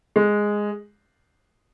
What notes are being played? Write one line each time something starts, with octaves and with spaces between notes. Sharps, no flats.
G#3